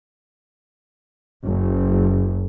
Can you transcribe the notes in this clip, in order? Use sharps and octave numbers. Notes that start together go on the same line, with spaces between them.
F#1